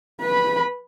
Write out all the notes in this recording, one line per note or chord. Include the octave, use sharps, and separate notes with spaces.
B4 B5